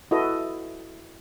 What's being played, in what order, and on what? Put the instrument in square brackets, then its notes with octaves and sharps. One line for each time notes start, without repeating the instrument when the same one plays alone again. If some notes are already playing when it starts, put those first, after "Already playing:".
[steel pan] E4 F#4 A4 B4 D#5